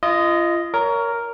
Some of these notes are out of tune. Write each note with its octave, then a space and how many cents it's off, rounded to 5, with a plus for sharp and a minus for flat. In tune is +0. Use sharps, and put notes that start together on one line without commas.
F4 -35 D#5 +0
A#4 +0 C#5 +25